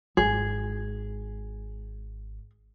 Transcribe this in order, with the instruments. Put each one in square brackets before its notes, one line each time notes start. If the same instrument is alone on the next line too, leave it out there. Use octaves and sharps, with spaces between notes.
[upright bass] G#1 [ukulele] G#4